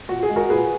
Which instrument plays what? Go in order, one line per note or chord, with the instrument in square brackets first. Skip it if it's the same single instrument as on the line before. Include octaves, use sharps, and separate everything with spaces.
[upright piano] A#2 F#4
G#4
G#3
F#4 A#4
A#2 G#4 B4